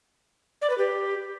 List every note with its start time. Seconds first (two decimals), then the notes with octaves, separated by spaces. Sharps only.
0.62 D5
0.70 B4
0.78 G4